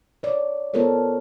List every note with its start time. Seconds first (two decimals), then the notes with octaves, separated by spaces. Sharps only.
0.23 C#5 D5
0.74 B3 F4 A4 A#4 C5 C#5